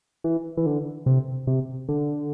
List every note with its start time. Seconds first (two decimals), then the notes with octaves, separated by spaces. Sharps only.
0.24 E3
0.57 E3
0.66 D3
1.06 C3
1.47 C3
1.89 D3